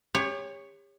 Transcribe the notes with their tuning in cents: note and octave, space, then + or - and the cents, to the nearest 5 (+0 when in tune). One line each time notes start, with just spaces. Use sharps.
G4 +40 C#5 +0